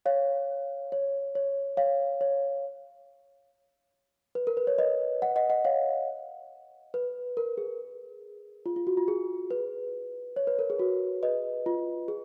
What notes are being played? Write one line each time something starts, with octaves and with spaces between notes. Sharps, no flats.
C#5 F5
C#5
C#5
C#5 F5
C#5
B4
A#4
B4
C#5
B4 D#5
D#5 F#5
D#5 F#5
D#5 F#5
C#5 F5
B4
A#4
G#4
F4
F4
F#4
F4
G#4
B4
C#5
B4
A#4
G#4
F#4
B4 D#5
F4
G#4